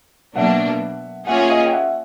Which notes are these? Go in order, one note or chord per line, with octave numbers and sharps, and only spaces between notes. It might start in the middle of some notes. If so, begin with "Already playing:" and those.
B2 F#3 A#3 D4 E5 F#5
A#3 C#4 F4 G#4 C#5 E5 F#5
D#5 F5
G5
E5 F#5